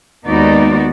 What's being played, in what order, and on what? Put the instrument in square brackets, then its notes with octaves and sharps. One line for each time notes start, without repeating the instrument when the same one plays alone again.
[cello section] D#2 G#3 B3 D#4 F#4 D5